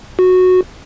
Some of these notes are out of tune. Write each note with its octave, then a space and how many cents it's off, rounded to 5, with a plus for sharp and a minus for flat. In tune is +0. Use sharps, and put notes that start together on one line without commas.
F#4 -10